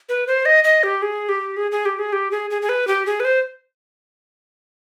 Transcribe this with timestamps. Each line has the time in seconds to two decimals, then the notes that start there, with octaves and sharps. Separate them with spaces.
0.09 B4
0.27 C5
0.45 D#5
0.64 D#5
0.83 G4
1.02 G#4
1.29 G4
1.57 G#4
1.71 G#4
1.85 G4
1.99 G#4
2.13 G4
2.31 G#4
2.50 G#4
2.62 G#4
2.69 B4
2.87 G4
3.06 G#4
3.20 B4
3.25 C5